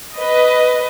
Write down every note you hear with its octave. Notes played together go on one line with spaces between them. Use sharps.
B4 D#5